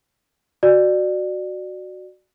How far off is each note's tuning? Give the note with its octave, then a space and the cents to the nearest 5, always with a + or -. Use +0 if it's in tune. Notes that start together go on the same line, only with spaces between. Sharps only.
F#4 +0 D5 +25